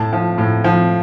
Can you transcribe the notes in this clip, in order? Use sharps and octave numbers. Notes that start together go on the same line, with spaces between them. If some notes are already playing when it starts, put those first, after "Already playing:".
Already playing: A2 A5
F3
A2
F3